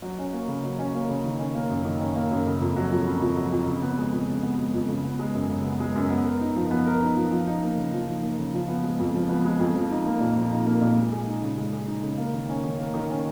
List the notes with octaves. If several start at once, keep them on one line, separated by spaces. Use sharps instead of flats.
F#3
C#4
A#3
C#3
F#3
C#4
A#3
C#3
D#3
C#4
A#3
F#2
D#3
C#4
A#3
F#2
C#3
F2
F#3
F2
C#3
F2
F#3
F2
C#3
B3
G#3
F2
C#3
B3
G#3
F2
C#3
B3
G#3
F#2
C#3
B3
G#3
F#2
B3
A#4
D#4
F3
B3
A#4
D#4
F3
F3
D#4
A#3
C#3
F3
D#4
A#3
C#3
F3
B3
G#3
F2
F3
B3
G#3
F2
F3
D#4
A#3
A#2
F3
D#4
A#3
A#2
G#3
G#4
D#4
C#3
G#3
G#4
D#4
C#3
A#3
D#3
C#4
D#3
A#3
D#3
C#4